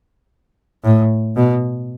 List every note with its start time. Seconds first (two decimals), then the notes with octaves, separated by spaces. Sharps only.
0.84 A2
1.36 B2